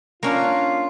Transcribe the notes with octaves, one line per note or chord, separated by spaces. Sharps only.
A#3 C#4 D4 F4